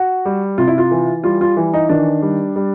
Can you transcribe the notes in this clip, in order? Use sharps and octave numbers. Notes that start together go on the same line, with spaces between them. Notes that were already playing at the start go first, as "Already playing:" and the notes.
Already playing: F#4
G3
C3 F4
E4
F4
E3
G3 F4
F4
E3
D#4
D#3 D4
G3
G3